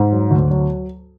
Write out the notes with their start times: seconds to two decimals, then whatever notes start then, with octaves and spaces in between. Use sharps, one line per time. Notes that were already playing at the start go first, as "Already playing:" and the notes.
Already playing: G#2
0.12 F#3
0.31 D2
0.51 F#3